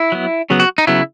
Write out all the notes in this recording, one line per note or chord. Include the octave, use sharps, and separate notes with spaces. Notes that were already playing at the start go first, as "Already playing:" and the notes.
Already playing: E4
F#3 B3
C#3 F#3 B3
F#4
D#4
C#3 F#3 B3 E4